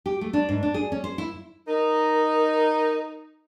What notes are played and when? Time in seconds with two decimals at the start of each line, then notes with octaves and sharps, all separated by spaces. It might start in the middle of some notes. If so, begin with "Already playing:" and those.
0.06 G4
0.21 A3
0.33 D4
0.49 G#2
0.63 D4
0.74 G#4
0.92 C#4
1.04 C5
1.18 E4
1.67 D#4 A#4